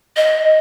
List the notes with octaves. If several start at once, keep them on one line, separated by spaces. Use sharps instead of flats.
D#5